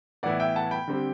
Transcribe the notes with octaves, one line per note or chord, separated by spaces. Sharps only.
A2 E3 B3 E4 D5 F#5
E5 G5
F#5 A5
G5 B5
D3 G3 C4